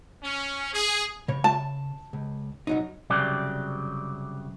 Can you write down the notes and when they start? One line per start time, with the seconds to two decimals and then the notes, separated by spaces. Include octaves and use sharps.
0.24 C#4
0.74 G#4
1.28 C#3 C#5
1.44 A5
2.13 C#2
2.67 C2 F#3 D#4
3.10 C2 F#2 C#3 F#3 G4 D5